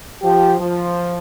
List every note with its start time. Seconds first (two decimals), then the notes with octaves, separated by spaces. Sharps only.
0.23 F3 G4
0.59 F3